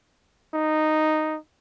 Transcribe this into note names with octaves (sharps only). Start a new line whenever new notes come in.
D#4